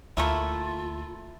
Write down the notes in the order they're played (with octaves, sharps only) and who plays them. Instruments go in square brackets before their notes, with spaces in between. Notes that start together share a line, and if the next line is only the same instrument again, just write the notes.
[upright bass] D2 [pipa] A3 A#3 E4 [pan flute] F4